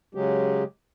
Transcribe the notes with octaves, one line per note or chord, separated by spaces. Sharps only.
C#3 F#3 G#3 G4